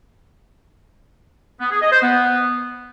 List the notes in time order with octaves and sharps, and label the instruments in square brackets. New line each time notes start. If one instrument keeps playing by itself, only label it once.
[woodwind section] B3
G#4
D#5
C5
B3